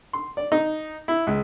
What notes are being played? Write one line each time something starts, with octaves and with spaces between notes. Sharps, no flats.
C6
D5
D#4
E4
C#2